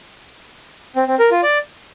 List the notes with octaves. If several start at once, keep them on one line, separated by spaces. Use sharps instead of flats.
C4
C4
A#4
F4
D5